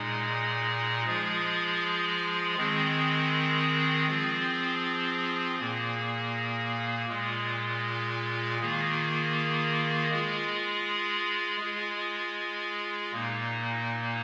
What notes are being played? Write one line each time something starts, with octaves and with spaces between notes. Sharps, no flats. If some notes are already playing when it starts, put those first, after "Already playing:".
Already playing: A#2 G#3 D#4 G#4
F3 G#3 F4 G#4
D#3 G#3 C4 G#4
F3 C4 F4 G#4
A#2 A#3 G#4
A#2 G#3 F4 G#4
D#3 A#3 F4 G#4
G#3 F4 G#4
G#3 F4 G#4
A#2 A#3 D#4